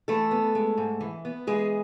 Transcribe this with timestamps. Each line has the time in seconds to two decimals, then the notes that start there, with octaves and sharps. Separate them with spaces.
0.08 E3 A3 A4
0.31 B3
0.55 G#3
0.77 G#2
1.01 E3
1.25 B3
1.47 E3 G#3 G#4